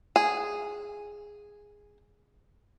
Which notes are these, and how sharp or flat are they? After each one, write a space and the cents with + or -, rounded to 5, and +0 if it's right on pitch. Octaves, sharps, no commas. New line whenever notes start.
G#4 -5